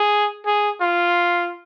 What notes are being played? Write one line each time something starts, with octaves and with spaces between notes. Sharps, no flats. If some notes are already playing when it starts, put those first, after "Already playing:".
Already playing: G#4
G#4
F4